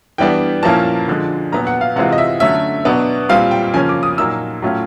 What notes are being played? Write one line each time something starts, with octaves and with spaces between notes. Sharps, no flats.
E3 G3 B3 D4 G5
A#2 F3 A#3 C#4 E4 A5
D3 F3 G#3
A#2 F#3 B3 A#5
F#5
F5
C3 E3 G#3 C4 F4 F#5
D#5
E5
D3 F#3 A3 C#4 E5
B2 F#3 B3 D4
A#2 G3 C4 F4 F5
G5
C#3 F3 A#3 C#4 G#5
D6
D#6
A#2 F#3 A#3 D#4 E6
A2 F#3 A3 C#4 F4